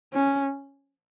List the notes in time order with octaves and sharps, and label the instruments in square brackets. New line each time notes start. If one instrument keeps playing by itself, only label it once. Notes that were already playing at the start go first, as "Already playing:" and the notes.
[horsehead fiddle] C#4